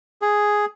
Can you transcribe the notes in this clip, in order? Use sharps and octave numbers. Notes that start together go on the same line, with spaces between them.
G#4